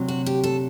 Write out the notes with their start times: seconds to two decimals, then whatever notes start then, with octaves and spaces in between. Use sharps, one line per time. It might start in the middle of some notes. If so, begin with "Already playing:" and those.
Already playing: D2 C3 F#3
0.08 F#4
0.26 G4
0.44 A4